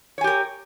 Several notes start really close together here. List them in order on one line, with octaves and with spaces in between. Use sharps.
C#5 G#5 G4 A#4